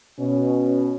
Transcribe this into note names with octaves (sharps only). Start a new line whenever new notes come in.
B2 C#4